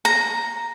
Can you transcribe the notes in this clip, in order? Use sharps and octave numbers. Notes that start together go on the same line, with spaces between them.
A#5